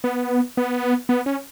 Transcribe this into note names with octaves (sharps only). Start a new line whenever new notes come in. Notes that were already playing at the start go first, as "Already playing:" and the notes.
B3
B3
B3
C#4